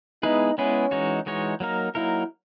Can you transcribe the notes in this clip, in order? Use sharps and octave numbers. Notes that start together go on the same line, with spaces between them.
G#3 B3 D#4 E4 G#4 B4
G#3 B3 C#4 E4 G#4 B4
E3 G#3 D#4 F#4 C#5
E3 G#3 D#4 F#4 C#5
F#3 A#3 D#4 A#4
F#3 A#3 D#4 E4 A#4